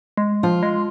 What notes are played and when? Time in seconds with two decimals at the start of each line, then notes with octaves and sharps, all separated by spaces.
0.17 G#3
0.43 F3 F4
0.63 G#3